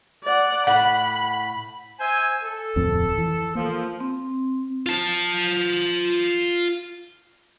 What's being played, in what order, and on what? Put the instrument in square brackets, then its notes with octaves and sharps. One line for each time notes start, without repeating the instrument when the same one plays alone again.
[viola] D5 F#5
[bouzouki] A2 F#5 [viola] B5
[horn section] C5 E5 G#5
A4
[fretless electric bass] D1 F2 C4
E3
[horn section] F3 [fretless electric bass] A#3
[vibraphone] C4
[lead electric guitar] F4 A5